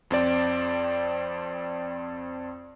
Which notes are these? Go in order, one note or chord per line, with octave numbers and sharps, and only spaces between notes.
F2 C4 D5